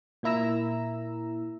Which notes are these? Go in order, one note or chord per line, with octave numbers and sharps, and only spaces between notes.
A#2 A#3 E4 A#5 E6